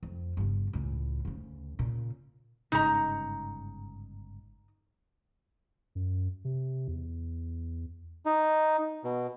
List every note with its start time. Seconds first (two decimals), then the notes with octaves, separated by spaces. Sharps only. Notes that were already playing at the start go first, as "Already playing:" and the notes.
0.03 F2
0.37 G1 C#3
0.73 C#2 A2
1.25 D2 C#3
1.79 A#2 C#3
2.72 G1 G#2 C#3 D#4 A#5
5.95 F#2
6.45 C3
6.88 E2
8.26 D#4
9.04 B2